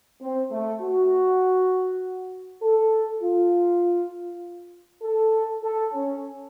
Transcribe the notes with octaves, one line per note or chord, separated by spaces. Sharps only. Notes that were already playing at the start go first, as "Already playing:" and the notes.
C4
A3
F#4
A4
F4
A4
A4
C#4